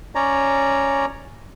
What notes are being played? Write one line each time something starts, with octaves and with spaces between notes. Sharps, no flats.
C#4 C#5 D5 A#5